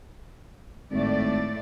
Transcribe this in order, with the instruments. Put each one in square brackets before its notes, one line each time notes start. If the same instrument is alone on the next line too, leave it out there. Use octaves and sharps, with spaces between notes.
[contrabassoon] G#1 [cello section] A2 A3 D5